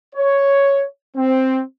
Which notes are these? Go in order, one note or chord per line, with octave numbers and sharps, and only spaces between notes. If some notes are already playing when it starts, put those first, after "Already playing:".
C#5
C4